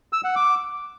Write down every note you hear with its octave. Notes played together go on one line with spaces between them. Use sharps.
E6
F#5
D6